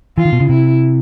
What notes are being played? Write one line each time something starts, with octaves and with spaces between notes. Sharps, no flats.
E3 F4
D#3
B2
C#3
C3 E4